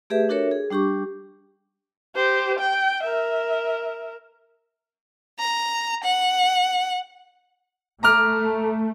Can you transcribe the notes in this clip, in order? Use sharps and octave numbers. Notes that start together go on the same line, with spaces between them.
A3 G4 G#4 B4 E5
D4 F#4 A4 A#4 C#5 E5
G#4
G3 D4 G4 C#6 D6
G4 C5
G5
A#4 E5
A#5
F#5
A3 A#5 D6 F6